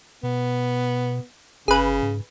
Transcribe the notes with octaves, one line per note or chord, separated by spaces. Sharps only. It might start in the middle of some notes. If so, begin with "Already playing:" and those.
B2 B3
G1 C#3 G#4 B4
G#2